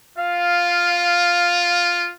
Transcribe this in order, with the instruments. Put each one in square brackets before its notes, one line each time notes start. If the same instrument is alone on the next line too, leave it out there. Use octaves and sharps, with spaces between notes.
[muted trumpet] F4 [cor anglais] F5